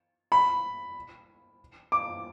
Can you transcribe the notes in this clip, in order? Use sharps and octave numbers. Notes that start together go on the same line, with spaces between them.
B5
D6